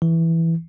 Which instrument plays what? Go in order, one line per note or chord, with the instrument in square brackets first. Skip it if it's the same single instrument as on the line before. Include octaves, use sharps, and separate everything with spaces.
[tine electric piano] E3